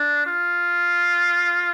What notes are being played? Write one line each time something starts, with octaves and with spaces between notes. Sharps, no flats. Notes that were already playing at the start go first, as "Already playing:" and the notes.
Already playing: D4
F4